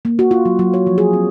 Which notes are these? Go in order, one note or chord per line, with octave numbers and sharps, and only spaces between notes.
A#3
F#4
F4
F#3
F#3
C#5
F3
G#4
C4